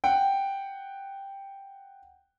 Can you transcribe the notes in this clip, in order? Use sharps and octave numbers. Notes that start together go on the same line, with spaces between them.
F#5 G5